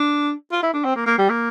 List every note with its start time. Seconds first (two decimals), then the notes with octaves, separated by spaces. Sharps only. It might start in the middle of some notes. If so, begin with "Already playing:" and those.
Already playing: D4
0.52 F4
0.63 E4
0.74 D4
0.84 C4
0.96 A#3
1.06 A#3
1.18 G3
1.30 A#3